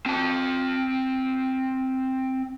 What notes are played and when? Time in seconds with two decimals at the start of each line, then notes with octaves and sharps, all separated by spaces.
0.06 C4 A5